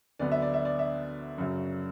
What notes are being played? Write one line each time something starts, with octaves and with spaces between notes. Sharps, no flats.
D2 D3 F#3 B3 D5
E5
D5
E5
D5
E5
F#2 C#3 F#3